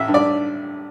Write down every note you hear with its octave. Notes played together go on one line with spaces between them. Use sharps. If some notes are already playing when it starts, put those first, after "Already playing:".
Already playing: A1 E5
G2
D5